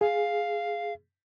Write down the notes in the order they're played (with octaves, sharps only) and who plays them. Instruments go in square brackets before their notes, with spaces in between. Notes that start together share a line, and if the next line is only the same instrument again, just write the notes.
[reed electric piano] G#4 [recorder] F5